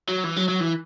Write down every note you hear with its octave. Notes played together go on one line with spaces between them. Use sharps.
F#3
E3
F#3
F#3
E3